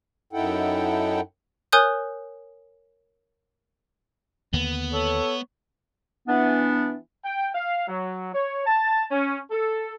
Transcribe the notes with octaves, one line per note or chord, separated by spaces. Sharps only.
F#2 D#4 E4 A4 F#5 G5
A#4 C#5 G#5 D#6 F#6 G6
D#2 D3 A#3 B3
A4 C#5
E3 B3 D4
G5
F5
F#3
C#5
A5
C#4
A4